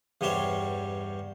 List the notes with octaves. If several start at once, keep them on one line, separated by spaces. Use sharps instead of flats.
E2 G2 G3 G4 C5 C#5